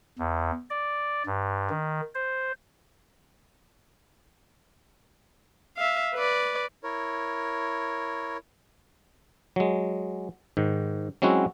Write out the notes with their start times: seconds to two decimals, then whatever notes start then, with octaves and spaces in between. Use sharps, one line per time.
0.19 E2
0.70 D5
1.26 G2
1.70 D#3
2.15 C5
5.77 E5 F5
6.14 B4 D5
6.83 E4 A#4 C#5
9.56 F#3 G#3
10.57 G#2 D#3
11.22 F#3 G#3 C4 C#4 E4 F#4